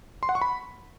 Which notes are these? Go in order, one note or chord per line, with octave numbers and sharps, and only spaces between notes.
C6
F#5
C#6
B5